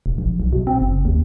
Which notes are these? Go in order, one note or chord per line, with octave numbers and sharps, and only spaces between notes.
E1
A#1
B1
B2
C4
F#1
D#2